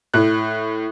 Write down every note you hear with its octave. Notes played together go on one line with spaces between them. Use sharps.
A2 F#6